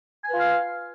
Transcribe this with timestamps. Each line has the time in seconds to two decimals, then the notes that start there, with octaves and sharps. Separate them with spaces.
0.24 G#5
0.29 B4
0.34 F4
0.38 F5